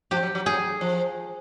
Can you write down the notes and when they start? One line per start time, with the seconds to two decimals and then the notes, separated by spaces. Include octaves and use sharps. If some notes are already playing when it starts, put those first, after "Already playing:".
0.11 F3 G4
0.23 F#3
0.35 F#3
0.46 F#3 G#4
0.81 F3